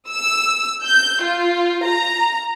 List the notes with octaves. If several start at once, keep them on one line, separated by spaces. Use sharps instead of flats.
E6
G6
F4
A#5